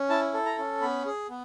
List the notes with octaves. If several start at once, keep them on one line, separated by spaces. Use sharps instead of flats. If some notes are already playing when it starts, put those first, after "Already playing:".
Already playing: C#4
E4 A5
A4
A#5
C#4
B3 B5
G#4
B3